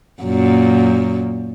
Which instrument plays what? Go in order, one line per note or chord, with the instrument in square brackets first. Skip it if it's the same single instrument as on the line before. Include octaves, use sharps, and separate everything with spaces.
[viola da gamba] F#2 A#2